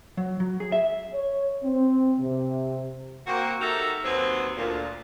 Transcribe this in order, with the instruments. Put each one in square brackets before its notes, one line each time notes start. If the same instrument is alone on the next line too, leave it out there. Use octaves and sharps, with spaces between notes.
[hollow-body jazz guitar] F#3
F#3
G#4
E5
[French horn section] C#5
C4
C3
[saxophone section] A#3 C4 F#4
D#4 F#4 G4 A4 A#4 E5
D#2 C3 F#3 B3 C4
D2 A#2